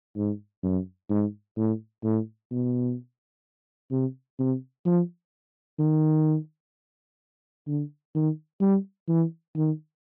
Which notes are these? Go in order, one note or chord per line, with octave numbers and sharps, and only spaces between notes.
G#2
F#2
G#2
A2
A2
B2
C3
C3
F3
D#3
D3
D#3
G3
E3
D#3